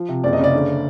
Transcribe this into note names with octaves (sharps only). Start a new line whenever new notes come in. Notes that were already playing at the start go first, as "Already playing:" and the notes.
Already playing: F3
C3
F#1 D5
D#5
C#3 D5
D3